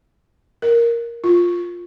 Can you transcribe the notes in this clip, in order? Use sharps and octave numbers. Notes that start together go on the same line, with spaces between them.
A#4
F4